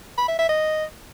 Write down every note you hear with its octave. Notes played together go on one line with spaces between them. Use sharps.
B5
E5
E5
D#5